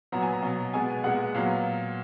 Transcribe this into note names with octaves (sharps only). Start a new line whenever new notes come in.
A#2 F#3 B3 A#5
G#5
A#5
B2 F#3 B3
B2 G#3 B3 G#5
A#2 G#3 B3 F#5
A#2 F#3 B3 F5